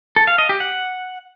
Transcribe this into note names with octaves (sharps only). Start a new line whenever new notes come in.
A4
F5
D#5
G4
F#5